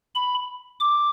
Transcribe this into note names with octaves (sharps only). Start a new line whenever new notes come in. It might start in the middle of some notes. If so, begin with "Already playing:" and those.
B5
D6